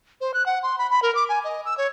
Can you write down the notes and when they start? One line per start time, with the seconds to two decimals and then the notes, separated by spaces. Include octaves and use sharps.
0.21 C5
0.34 F#6
0.46 F#5
0.63 C6
0.78 B5
0.90 B5
1.02 A#4
1.15 D6
1.29 G#5
1.44 D#5
1.65 E6
1.78 C#5